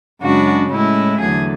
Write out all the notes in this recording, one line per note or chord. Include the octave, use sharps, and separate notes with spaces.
F#2 C#3 G#3 D4 F#4
A2 G#3 C#4 E4
E2 D3 F#3 A3 G#4